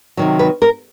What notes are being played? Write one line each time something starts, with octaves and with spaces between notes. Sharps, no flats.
C3 D#3 F#3
B4
A#4